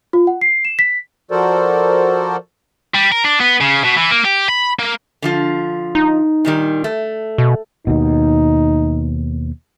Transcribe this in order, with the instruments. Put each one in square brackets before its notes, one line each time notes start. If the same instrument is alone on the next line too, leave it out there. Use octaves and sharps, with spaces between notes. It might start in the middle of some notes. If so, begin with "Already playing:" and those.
[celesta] F4
F#5
C7
E7
B6
[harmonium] F3 F#4 A4 A#4 C5 D5
[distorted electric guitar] G3
A#4
D4
B3
C#3
B2
E3
A#3
G4
B5
A#3
[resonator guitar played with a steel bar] D3 F3 F4
[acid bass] D#4
[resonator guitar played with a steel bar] A#2 D#3 G3
A3
[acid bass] B2
[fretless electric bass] D#2 B2 [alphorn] D#4